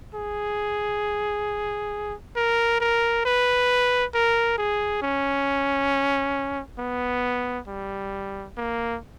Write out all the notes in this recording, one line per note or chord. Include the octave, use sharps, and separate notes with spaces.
G#4
A#4
A#4
B4
A#4
G#4
C#4
B3
G3
A#3